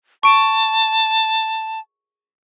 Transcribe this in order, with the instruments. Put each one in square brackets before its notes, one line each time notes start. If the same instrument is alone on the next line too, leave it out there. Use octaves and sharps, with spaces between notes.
[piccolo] A5 [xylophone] C#6 D7